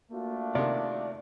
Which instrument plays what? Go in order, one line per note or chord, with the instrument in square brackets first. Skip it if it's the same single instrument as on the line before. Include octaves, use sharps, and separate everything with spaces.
[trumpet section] A3 D4 F4 [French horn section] A#3 F#4
[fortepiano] C3 D#3 [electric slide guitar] D5